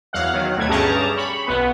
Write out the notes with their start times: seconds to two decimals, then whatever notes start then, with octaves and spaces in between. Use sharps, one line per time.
0.13 E2 F#3 F5 F#5
0.34 D#3 F#3
0.56 D2 B2 F#3 A3 G#6
0.69 G2 C#4 G4 G#4 A5 A#5
1.17 B5 C#6
1.47 B1 B3 B4